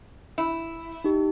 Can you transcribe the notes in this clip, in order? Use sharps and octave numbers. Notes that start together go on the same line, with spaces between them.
E4
D#4 G4